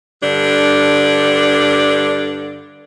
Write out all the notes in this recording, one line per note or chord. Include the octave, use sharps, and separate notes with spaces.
G2 D3 D4